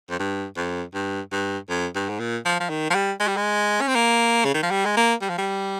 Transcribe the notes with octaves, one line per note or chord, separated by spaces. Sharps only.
F2
G2
F2
G2
G2
F2
G2
G#2
A#2
F3
F3
D#3
F3
G3
G#3
G3
G#3
C#4
C4
A#3
C#3
D#3
F3
G3
G#3
A#3
G3
F3
G3